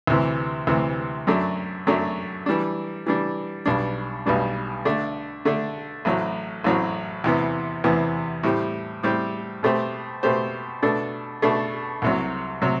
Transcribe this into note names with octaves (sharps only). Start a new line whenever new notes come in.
D2 C3 E3
D2 C3 E3
F#2 F#3 A3 D4
F#2 F#3 A3 D4
E3 G3 D4
E3 G3 D4
B1 B2 G3 D4
B1 B2 G3 D4
D3 A3 D4
D3 A3 D4
A1 A2 F#3 C4
A1 A2 F#3 C4
E2 C3 E3 B3
E2 C3 E3 B3
A2 G3 C4 G4
A2 G3 C4 G4
B2 A3 C4 G4 C5
B2 A3 C4 G4 C5
B2 A3 D4 A4
B2 A3 D4 A4
C2 C3 F#3
C3 F#3